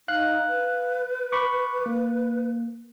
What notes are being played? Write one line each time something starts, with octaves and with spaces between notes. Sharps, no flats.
D#4 F5 F#6
B4
B5 C#6 D6
A#3